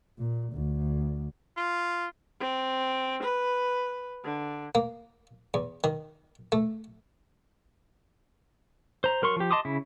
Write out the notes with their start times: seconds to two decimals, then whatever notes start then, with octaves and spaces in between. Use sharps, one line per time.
0.18 A#2
0.54 D2
1.57 F4
2.40 C4
3.23 B4
4.24 D3
4.75 A#3
5.54 E2
5.84 D#3
6.52 A3
9.04 C5 A#5
9.22 F#3 A#4 C6 C#6
9.36 F3 G4
9.51 D#5 A5 C6 D6 D#6
9.65 C#3 E4